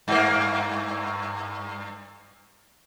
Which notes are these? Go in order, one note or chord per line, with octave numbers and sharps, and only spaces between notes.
G2 A#3